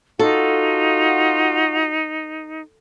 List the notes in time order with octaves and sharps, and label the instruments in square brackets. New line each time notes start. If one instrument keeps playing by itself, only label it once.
[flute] D#4 [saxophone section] F4 F#4 [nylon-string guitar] A4